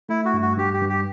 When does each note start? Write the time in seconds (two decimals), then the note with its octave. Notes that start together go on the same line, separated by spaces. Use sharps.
0.09 A3 E4
0.25 F#4
0.34 G2
0.42 F#4
0.57 G2 G4
0.74 G4
0.82 G2
0.89 G4